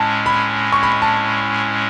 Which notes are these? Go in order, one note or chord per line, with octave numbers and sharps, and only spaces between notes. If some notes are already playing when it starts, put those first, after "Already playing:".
Already playing: A2 G#3 C#4 A5
B5
C#6
B5
A5